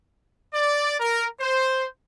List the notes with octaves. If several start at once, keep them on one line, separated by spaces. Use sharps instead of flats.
D5
A#4
C5